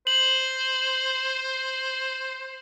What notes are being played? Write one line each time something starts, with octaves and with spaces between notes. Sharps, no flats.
C5 F#7